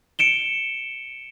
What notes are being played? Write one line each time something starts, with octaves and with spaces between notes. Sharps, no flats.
C#7 D7 E7 G7